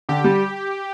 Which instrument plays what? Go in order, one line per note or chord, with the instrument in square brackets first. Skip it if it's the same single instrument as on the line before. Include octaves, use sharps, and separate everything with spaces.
[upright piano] D3 [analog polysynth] G4
[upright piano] G3